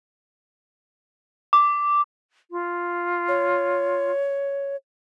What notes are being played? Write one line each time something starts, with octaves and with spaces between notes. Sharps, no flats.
D6
F4
C#5